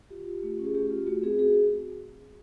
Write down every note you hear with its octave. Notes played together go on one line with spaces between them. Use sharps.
F4 G4
F4
A3
C#4
G#4
A3 G4
F4
A3 F#4
C4 G#4
F#4 G#4